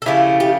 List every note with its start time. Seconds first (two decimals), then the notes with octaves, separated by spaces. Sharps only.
0.02 A4
0.06 C#3 F3 A3 E4 G4
0.40 G4